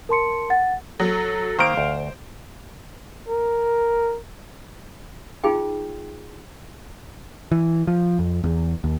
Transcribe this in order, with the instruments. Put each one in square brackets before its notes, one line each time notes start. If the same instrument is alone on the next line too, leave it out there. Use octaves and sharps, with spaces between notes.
[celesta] A#4 A5 C6 C#7
F#5 A6
[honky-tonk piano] F#3 [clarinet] A4
[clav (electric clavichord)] D#3 A#3 [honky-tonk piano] C5 D7 [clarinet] F5
[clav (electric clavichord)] D2
[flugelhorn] A#4
[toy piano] D#4 F4 G#4 G5
[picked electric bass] E3
F3
F2
E2
D#2